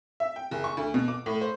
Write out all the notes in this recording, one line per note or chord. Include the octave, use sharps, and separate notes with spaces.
E5
G5
F#1
C#6
D2
B2
D6
A2
C5